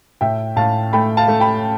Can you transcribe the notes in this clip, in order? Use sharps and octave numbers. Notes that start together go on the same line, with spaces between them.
A2 E5 G5
A2 F5 A5
A3 G5 B5
F5 A5
A3
G5 B5